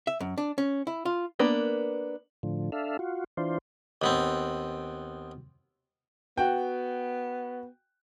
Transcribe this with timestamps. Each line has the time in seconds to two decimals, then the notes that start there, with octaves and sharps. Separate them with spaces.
0.07 E5
0.20 F#2
0.38 D4
0.58 C#4
0.87 E4
1.05 F4
1.39 A#3 B3 D4
2.43 A2 D3 F3
2.72 D4 A4 E5 F5
2.99 F4 F#4
3.37 E3 D4 F4 C5
4.02 D#2 B3 C4
6.37 B3 F#4 G5